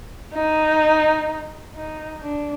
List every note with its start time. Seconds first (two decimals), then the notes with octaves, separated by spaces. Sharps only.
0.34 D#4
1.75 D#4
2.23 D4